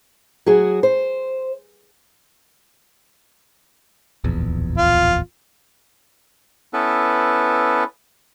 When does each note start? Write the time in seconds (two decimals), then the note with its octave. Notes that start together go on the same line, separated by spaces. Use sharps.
0.46 F#3 F#4 G#4
0.83 C5
4.24 D1 A#1 E2
4.77 F4
6.73 B3 C#4 E4 A4 B4